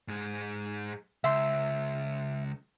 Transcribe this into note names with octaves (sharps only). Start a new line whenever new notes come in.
G#2 G#4
C#2 E5 C6